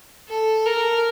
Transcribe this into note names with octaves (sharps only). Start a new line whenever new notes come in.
A4
A#4